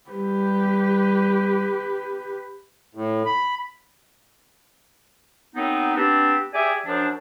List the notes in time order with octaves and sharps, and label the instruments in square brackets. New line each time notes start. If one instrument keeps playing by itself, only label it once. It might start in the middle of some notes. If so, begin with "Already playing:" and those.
[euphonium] G3 [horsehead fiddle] G4 B4
[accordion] A2
B5
[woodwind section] F#2 B3 C4 D#4
B3 C4 D4 G4 A5
G4 G#4 D5 E5 G#5
F#2 F3 D4